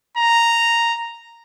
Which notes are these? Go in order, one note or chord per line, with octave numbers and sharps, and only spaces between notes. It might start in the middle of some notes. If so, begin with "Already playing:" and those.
A#5